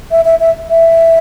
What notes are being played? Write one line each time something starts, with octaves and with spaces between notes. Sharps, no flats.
E5
E5
E5
E5